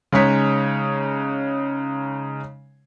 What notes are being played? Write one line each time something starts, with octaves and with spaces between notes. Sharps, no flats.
C#3 G#3 D#4 C#5 B6